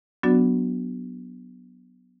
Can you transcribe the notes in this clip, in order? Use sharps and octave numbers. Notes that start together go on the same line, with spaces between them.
F#3 B3 D4 F#4 D5